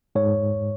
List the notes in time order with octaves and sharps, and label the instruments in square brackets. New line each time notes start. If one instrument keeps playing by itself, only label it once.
[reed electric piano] G#2 [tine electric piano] C#5